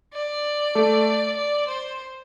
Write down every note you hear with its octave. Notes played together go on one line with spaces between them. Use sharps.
D5
A3 A4
D5
C5